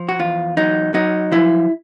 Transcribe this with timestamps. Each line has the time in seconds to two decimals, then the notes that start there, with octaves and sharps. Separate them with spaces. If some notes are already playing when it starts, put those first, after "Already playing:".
Already playing: F3
0.09 F#4
0.19 E2 F4
0.57 F#3 D#4
0.94 F#3 D#4
1.32 F3 E4